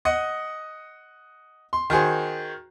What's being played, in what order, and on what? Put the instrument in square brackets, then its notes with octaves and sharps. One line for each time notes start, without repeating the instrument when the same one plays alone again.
[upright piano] D#5 F#5 D#6
C6
D#3 F#4 G#4 C5